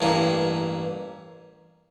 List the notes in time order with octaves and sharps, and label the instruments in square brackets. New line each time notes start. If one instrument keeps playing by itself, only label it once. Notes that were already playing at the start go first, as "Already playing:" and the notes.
[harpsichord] A1 G2 E3 A#3